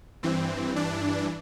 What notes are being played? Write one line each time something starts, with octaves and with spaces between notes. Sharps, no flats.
G2 E3 C4
D4